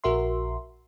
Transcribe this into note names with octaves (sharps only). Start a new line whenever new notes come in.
A#1 F#4 A#4 E5 C6